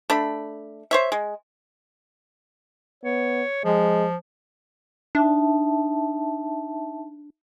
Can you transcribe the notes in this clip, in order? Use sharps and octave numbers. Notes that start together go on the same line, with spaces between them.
A3 D4 B5
C5 C#5 E5
G#3
B3 C#5
F3 G#3
D4 D#4 E5 A5